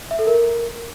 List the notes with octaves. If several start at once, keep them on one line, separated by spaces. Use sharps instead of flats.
E5
A4
A#4